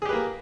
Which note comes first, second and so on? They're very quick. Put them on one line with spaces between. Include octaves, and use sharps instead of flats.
G#4 G4 B4 A#3